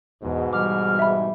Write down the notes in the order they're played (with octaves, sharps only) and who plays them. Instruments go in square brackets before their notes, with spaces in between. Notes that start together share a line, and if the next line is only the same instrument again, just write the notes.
[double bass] E2 [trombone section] G#2 B2
[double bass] E3 G3 [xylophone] D6 [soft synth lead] F6
[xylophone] E5 B5